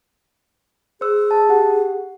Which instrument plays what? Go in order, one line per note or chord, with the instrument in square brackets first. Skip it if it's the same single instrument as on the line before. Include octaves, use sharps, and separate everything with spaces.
[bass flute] G#4 [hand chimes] C5 E6
[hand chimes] A5
G4 F#5